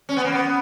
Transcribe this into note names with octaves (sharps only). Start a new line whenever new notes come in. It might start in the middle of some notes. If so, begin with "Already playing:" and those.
C#4
B3
A#3
B3